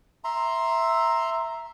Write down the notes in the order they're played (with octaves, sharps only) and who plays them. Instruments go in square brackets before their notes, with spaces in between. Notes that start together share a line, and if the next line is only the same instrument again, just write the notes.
[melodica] E5 A#5 C6